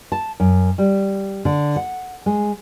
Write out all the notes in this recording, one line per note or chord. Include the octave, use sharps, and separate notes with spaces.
A5
F#2
G3
D3
F#5
G#3